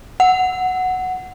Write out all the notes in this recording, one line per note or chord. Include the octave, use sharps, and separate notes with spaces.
F#5